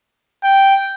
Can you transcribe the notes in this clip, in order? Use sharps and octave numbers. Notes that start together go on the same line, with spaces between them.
G5